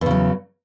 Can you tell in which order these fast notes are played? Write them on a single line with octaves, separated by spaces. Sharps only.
E2 C#3 F#3